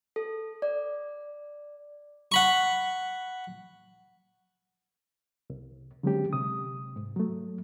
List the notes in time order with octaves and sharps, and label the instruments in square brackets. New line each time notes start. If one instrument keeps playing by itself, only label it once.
[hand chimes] A4
D5
[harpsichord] F#5 B5 C#6
[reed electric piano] C2
D3 F#3 G#3 C4 C#4 G4
C3 D#6
G#2
F#3 A3